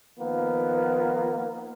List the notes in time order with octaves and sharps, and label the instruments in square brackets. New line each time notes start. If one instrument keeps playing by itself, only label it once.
[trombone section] D#3 F3 A#3 B3